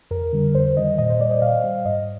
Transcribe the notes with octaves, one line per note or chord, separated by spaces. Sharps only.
F2 A#4
D3 G3
F2 C5
D#3 G3 D#5
A#2 D#5
C5
G3 D5
D#5
A#2 F5
G3
G#2 D#5